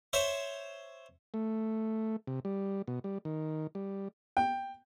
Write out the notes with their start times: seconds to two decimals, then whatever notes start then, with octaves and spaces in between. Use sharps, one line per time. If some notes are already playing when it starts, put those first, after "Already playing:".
0.13 C5 C#5 E5
1.34 A3
2.27 C3
2.45 G3
2.88 B2
3.04 G3
3.25 D#3
3.75 G3
4.37 G5